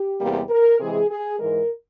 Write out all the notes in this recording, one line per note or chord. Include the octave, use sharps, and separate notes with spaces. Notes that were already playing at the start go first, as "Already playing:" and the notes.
Already playing: G4
E2 C3 G3 A#3
A#4
C3 E3 G#3 G#4
G#4
G#2 E3 G#3 A#4